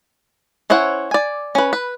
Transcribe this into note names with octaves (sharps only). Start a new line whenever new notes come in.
C#4 E4 C5 C#5 F#5
D5 G#5
C#4 B4
B4